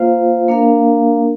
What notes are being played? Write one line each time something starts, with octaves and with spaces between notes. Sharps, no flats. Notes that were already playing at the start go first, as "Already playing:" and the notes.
Already playing: A#3 F4 C5 F5
A#3 D4 A#4 F5